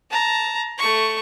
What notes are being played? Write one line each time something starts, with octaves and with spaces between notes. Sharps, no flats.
A5 A#5
A3 C#6